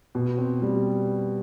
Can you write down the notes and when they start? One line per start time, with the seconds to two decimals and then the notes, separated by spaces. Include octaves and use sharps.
0.15 B2
0.38 C4
0.62 G3